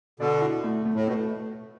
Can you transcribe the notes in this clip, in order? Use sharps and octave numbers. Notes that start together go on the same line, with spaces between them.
B2 D3 D5
E4
A3
A3
A2
B2 A3